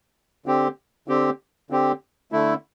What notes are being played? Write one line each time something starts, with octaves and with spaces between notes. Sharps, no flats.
D3 C4 G4
D3 C4 G4
D3 C4 G4
D3 A3 E4